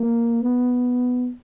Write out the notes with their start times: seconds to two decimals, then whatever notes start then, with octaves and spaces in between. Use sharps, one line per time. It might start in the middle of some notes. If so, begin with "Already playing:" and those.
Already playing: A#3
0.41 B3